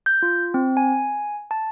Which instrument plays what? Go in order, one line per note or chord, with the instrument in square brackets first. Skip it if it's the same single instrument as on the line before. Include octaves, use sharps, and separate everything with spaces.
[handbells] G6
F4
C4
G#5
A5